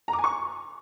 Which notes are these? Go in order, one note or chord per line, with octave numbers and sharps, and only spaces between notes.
A#5
D6
G#5
C#6